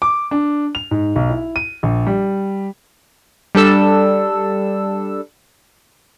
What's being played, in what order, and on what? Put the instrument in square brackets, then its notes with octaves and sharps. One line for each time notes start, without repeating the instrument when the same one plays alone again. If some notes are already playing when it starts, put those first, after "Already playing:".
[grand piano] D6
D4
F7
G#2
B1
E4
D#7
A#1
G3
[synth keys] G3 D4 A4 E6